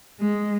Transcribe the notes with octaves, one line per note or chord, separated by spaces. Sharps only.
G#3